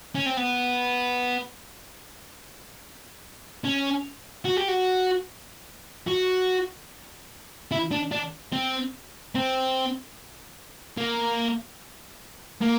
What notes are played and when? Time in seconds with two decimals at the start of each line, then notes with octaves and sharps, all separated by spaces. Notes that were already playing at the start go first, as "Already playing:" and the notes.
0.15 C#4
0.26 C4
0.37 B3
3.64 C#4
4.45 F#4
4.57 G4
4.68 F#4
6.08 F#4
7.72 E4
7.91 D4
8.12 D4
8.53 C4
9.35 C4
10.97 A#3
12.61 A#3